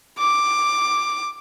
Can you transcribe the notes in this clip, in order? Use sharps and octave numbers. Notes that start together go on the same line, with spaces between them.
D6